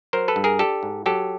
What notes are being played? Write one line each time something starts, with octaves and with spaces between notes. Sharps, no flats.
F#3 A#4 C5
A4 B4
G2
G#4 A#4
D4 G4 A4
G#2
F#3 G4 A4